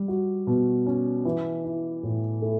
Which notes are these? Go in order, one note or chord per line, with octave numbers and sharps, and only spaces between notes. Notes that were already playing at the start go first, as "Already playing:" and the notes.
Already playing: G3
F#4
B2
C#4
E3
E4
A2
A3